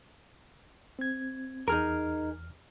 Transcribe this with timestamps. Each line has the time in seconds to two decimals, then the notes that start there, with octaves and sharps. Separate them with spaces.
0.99 C4 G#6
1.68 E2 D#4 G#4 A#4 F6